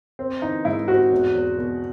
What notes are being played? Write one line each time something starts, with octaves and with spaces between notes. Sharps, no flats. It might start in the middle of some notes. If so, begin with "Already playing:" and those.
C4
E3 D#4
G#2 E4
C4 F#4
E2
E2
B2